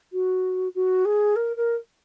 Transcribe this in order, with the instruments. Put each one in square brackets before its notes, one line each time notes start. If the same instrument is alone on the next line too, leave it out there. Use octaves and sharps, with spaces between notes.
[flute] F#4
F#4
G#4
A#4
A#4